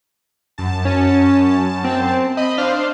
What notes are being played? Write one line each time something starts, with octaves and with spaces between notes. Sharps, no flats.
F#2 A5
C#4
C4
D#5 B5
D4 C5 F5